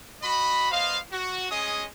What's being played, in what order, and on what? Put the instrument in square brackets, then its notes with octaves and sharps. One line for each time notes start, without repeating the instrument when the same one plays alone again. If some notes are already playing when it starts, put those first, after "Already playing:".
[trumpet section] F#4 D#5 B5
B3 C5 D#5 F5
F#4
G#3 C#4 G#4 D#5 D#6